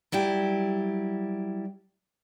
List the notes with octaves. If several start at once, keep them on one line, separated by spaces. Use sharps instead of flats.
F#3 G3 E4 G4